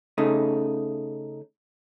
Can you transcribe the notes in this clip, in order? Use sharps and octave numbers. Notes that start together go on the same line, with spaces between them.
C#3 A3 D#4